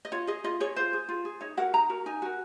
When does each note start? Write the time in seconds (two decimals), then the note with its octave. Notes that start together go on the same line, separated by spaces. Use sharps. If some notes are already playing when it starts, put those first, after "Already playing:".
0.05 D#5
0.12 F4 C#5
0.27 G#4 D#5
0.44 F4 D#5
0.60 G#4 C#5
0.76 F4 C5
0.93 G#4
1.09 F4
1.25 G#4
1.41 D#4 C#5
1.57 F#4 A#4 F#5
1.73 D#4 A#5
1.90 F#4 A#4
2.06 D#4 G#5
2.22 F#4 A#4